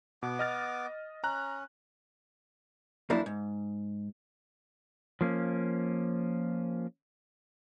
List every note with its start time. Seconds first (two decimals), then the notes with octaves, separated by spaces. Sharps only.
0.23 B2 B3 D6
0.39 D#5 F6 A6
1.24 C#4 A#5 F#6
3.10 F#2 F3 A#3 D4 E4
3.26 G#2
5.21 F3 A#3 C#4